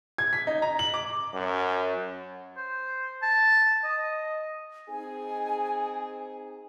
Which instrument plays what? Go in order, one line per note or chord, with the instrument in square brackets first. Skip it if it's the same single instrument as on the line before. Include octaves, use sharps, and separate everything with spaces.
[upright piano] G#6
B6
D#4
A#5
F#7
D6
[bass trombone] F#2
[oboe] C5
A5
D#5
[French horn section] C4 D#4 G#4 [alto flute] G#5